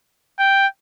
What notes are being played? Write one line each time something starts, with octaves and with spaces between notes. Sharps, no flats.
G5